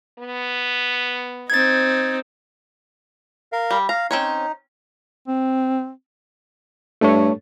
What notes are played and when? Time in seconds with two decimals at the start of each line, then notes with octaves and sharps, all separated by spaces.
0.19 B3
1.50 C4 D#4 G#6 A6
3.53 A#4 F5
3.71 G3
3.89 F5 A#5
4.11 C4 C#4 D#4 C#5
5.28 C4
7.01 G2 A3 A4 C#5